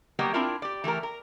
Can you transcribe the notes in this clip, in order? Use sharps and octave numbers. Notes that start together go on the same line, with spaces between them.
F#3 G3 A#3 B3 G4 D#5
C4 D4 E4 F4 A#4
G4 D5
E3 A3 G4 A#4
A#4